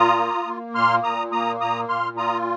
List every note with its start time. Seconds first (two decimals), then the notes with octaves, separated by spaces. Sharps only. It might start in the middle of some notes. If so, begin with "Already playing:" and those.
Already playing: A#2 F4 A#5 D#6
0.18 A#3
0.46 A#3
0.75 A#2 C6 F6
1.03 A#2 A#5 D#6
1.32 A#3 A#5 D#6
1.60 A#2 A#5 D#6
1.89 A#2 C6 F6
2.17 F4 A#5 D#6